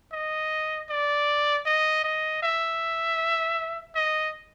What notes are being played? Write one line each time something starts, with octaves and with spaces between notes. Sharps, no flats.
D#5
D5
D#5
D#5
E5
D#5